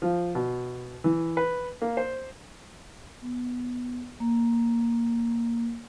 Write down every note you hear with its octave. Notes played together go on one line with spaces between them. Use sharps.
F3
B2
E3
B4
A#3
C5
B3
A#3